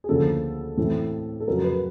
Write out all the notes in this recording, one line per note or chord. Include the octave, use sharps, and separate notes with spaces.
G#4
D2 C#3 F3 A#3 A4
A2 E3 A3 C4
A4
F2 C#3 F#3 A#4
B4